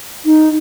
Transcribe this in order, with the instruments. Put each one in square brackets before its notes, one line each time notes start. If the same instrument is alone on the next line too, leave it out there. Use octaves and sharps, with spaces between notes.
[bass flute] D#4